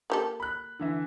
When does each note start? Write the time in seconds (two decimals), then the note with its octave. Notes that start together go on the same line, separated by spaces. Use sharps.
0.10 A#3 G4 A4
0.40 B5 F#6
0.79 D3 E3 E5